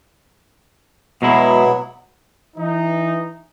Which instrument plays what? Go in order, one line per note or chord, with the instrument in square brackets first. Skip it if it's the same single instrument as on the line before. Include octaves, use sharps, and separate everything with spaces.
[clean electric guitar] B2 G#3 E4 [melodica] F#3 B3
[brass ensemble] E3 D#4